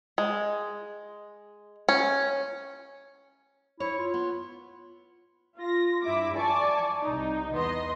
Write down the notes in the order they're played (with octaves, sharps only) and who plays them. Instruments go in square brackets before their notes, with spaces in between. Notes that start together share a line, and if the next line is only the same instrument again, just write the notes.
[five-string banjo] G#3
C#4
[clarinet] E4 [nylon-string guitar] C#5
[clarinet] F4
[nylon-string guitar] B3
[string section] F4 A#6
G2 E4 E5 D6
D5 G#5 A5 C#6 D6
C2 D#4
E2 B3 D#5 C6